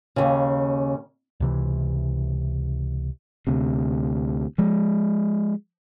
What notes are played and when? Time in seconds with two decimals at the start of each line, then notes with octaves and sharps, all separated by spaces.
0.16 D#2 C#3
1.40 C#2 C3 E3
3.47 D2 C3
4.58 F3 G#3